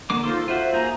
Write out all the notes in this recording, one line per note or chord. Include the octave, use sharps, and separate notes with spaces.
D3 A#3 D6
D#4 F4 A4 C5
F4 F#4 C5 E5
A#3 G#4 A#5 G6